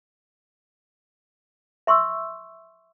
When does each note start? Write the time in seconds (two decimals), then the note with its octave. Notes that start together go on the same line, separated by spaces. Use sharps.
1.87 E5 C6 C#6 E6